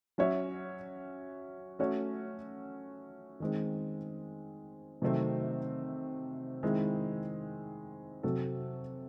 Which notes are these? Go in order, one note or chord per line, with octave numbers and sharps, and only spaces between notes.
F#3 C#4 F#4 C#5 E5
A3 C#4 F#4 C#5
D#3 G#3 C4
C3 D#3 F#3 A3 C4
D#3 G#3 C4 E4
C3 F#3 C4 F#4 A4